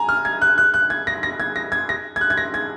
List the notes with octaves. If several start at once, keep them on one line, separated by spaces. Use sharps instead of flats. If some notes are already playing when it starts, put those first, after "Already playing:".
Already playing: G#5 A#5
F6
G#6
F#6
F#6
F#6
G#6
A#6
A#6
G#6
A#6
G#6
A#6
G#6
F#6
G#6
A#6
G#6